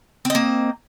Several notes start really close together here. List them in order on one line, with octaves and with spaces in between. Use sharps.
C4 D#5 A#3